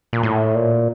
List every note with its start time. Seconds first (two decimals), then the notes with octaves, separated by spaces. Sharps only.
0.13 A#2
0.23 A2
0.55 A#2